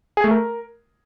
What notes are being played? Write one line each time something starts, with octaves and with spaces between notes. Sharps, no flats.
G#4
A3
A#4